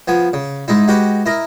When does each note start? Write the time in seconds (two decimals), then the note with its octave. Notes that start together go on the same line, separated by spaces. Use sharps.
0.08 F3 B3 G#5
0.33 C#3
0.68 G#2 G#3 D#4 E4
0.88 G#3 F#4 G4 B4 F#5
1.26 E4 A#4 D#5